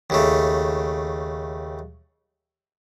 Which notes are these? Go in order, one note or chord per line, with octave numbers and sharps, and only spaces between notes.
D#2 C#3 A3